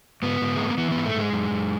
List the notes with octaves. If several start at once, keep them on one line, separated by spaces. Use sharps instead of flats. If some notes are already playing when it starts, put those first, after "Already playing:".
G#2 B3
G#2
G#3
G3
A3
A#3
E3 B3
G#2 B3
A3
G#2 G#3
F#2
F#2